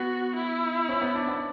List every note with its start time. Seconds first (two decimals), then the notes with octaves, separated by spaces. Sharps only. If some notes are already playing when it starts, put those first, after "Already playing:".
Already playing: B3 F#4
0.36 E4
0.89 C#4
1.02 B3
1.15 D4
1.28 B3